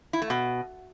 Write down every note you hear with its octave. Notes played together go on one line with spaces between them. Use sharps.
E4
A3
B2